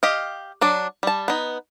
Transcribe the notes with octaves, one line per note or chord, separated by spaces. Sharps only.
G4 D#5 F5
F#3 D4 D5
G3 A5
B3 D#4